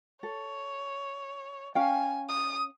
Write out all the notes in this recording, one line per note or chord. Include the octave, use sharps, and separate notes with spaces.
A4 C#5
C#4 F5 G5 G#5
D#6